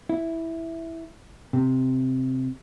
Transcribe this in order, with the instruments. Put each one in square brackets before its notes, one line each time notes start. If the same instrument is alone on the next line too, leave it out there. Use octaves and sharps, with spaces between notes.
[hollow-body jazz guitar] E4
C3